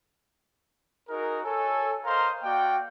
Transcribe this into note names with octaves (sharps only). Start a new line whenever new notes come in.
D#4 F#4 G#4 A#4
A4 C#5 G#5
A#4 C5 D#5 F5 A#5 C6
A#3 F#4 D5 F5 G5